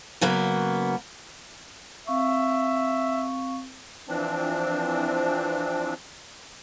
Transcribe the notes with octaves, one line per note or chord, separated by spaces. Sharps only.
C#3 F#3 A#3 B3
C4 E5 F5 C#6
E3 F3 C4 D4